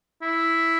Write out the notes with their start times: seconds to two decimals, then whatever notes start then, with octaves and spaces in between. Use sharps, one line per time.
0.22 E4